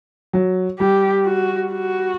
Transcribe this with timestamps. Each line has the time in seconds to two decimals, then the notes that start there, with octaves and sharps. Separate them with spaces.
0.33 F#3
0.79 G3 G4
1.26 F#4
1.72 F#4